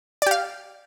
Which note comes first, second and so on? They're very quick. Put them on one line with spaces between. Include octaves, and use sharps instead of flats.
D5 G4 F5